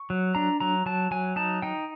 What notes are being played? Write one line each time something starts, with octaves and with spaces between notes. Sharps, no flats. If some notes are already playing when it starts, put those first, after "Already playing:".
Already playing: C#6
F#3
D4 A#5
F#3 A#5
F#3 A5
F#3 G#5
D#4 A5
D#4 G5